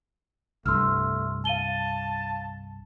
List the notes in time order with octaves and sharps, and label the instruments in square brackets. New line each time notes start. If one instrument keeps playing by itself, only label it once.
[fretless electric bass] C2 G2 [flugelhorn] A3 [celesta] C6 E6 F6
[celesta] F5 D#7 G7 [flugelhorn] A5